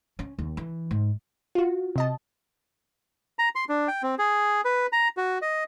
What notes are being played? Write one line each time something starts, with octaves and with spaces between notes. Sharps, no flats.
C#4
D#2
E3
G#2
F4 F#4
C3 D#5 A5
A#5
C6
D4
G5
C4
G#4
B4
A#5
F#4
D#5